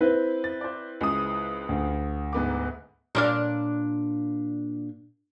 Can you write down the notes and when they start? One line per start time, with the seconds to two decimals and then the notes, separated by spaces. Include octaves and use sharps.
0.01 C4 E4 B4
0.44 A6
0.61 C5 D5
1.01 C#2 G#3 D#6
1.69 D2
2.33 G#2 B3 D6
3.15 A#2 D4 F5